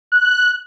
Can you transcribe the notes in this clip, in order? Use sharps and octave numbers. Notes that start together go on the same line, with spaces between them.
F#6